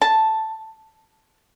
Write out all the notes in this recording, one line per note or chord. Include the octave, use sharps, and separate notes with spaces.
A5